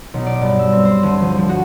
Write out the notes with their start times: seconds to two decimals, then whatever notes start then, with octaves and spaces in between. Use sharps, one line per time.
0.14 B1
0.26 D5
0.41 G2
0.59 E6
0.72 C4
0.85 C5
1.03 D2
1.21 F3
1.38 F3
1.49 F#4